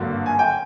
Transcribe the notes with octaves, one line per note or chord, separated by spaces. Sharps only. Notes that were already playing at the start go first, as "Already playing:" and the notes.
Already playing: G#1 G2 D3 F#3 A#3
G#5
G5